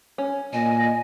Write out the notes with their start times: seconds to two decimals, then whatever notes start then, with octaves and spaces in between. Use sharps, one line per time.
0.18 C#4
0.53 A#2 D#5 G#5